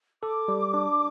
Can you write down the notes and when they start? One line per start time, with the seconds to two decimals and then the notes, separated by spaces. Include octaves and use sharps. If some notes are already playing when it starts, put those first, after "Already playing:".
0.23 A4 D6
0.48 G3
0.74 D4